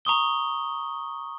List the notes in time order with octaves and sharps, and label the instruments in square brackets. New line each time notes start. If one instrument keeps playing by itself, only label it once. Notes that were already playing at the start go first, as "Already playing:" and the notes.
[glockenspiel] A#5 C#6 D#6 G7